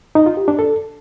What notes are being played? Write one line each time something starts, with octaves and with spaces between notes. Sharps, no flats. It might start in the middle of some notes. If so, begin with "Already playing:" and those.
D#4
F4
G4
D4
A4